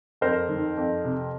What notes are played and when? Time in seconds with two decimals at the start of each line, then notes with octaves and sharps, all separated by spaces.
0.21 F2 A#4 C5
0.49 D#3
0.77 F2
1.04 C3